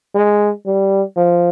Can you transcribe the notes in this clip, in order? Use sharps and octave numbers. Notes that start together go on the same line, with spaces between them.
G#3
G3
F3